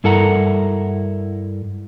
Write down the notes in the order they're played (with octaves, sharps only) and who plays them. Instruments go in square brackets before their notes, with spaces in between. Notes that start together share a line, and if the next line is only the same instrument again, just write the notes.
[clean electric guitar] G2 E4 A4 A#4 F#5 A#5